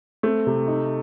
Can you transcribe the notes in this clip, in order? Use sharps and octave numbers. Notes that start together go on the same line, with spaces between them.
A3 C4
C3
D#4